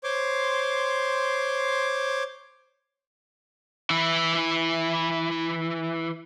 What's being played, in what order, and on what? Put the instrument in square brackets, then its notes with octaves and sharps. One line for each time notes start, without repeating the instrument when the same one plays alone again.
[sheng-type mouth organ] C5 C#5 C6 D6
[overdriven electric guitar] E3 E4